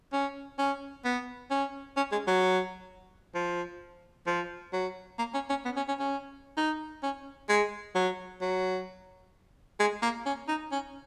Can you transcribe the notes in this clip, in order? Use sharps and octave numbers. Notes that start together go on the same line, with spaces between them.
C#4
C#4
B3
C#4
C#4
G#3
F#3
F3
F3
F#3
A#3
C#4
C#4
B3
C#4
C#4
C#4
D#4
C#4
G#3
F#3
F#3
G#3
A#3
C#4
D#4
C#4